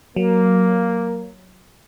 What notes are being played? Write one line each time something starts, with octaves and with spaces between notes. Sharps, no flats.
F#3 A#3